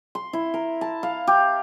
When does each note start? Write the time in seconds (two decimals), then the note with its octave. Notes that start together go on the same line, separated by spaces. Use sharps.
0.15 C6
0.33 E4
0.54 A#4
0.81 A5
1.03 F5
1.27 G4